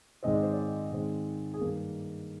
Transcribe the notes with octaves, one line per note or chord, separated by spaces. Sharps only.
G#2 D#3 G#3 C4 D#5
D5
C5
D5
G#2 D#3 G#3 C4
G#4
G2 D#3 A#3 A#4